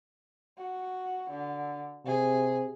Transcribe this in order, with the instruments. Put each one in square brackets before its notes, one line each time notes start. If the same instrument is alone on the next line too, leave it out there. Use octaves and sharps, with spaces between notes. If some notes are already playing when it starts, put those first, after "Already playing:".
[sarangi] F#4
D3
[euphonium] C3 [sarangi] G#4